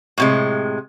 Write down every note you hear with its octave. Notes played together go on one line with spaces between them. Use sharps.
A2 C3 G#3